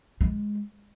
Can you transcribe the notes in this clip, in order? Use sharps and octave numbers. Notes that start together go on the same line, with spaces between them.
G#3